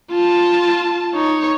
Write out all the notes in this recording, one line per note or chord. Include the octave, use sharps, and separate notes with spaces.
F4 A5
D#4 C#5